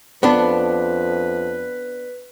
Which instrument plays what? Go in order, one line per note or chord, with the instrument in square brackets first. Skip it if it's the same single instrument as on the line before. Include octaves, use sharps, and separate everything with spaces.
[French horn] F2 [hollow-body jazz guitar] B3 D4 [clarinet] B4